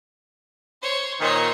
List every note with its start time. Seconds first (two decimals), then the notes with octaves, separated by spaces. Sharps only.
0.82 C5 C#5
1.21 A#2 D#3 C5 C#5